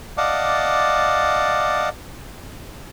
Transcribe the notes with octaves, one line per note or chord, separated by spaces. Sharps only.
D5 D#5 F5 F#5 A5 D6